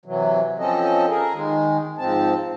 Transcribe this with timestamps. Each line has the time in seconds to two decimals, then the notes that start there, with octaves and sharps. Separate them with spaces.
0.06 C3 E3 F#3
0.59 F3 C4 C#4 A4 D#5
1.09 G#4 A#4
1.33 D#3 G#3
1.98 G#2 F3 C4 A5